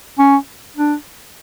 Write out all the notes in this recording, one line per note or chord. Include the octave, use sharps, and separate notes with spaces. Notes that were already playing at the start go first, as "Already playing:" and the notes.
C#4
D4